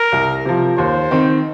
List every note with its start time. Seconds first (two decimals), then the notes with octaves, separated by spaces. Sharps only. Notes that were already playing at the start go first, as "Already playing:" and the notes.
Already playing: A#4
0.12 C2
0.45 C3 F3
0.78 D#2 C5
1.11 D#3 C4